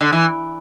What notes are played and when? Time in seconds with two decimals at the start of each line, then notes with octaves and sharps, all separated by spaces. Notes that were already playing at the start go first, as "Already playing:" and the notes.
0.01 D3
0.12 E3